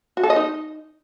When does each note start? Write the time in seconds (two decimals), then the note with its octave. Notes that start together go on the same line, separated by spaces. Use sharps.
0.17 F#4
0.23 A4
0.30 D#5
0.36 D#4